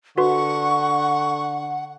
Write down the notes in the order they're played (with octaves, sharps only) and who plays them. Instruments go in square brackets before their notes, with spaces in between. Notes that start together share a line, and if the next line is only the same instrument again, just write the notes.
[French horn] D3 [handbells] F#4 B4 C6 [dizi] F#5 [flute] C#6